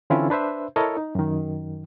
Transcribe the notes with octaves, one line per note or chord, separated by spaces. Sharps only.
D3 E3 C4 C#4 E4 F4
D4 B4 C5 E5
E4 A4 A#4 C#5 D#5
D#4
F#2 D#3